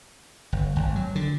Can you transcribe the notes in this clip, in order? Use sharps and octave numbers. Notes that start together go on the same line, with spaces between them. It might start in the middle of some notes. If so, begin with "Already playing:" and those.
G1
G#1
F#3
D3